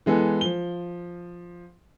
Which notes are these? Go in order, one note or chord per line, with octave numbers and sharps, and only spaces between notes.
E3 G#3 B3 A4
F3 G7